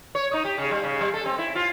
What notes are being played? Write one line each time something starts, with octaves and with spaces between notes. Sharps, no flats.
C#5
D#4
G4
C#3
G3
C#3
G3
A4
C4
E4
F4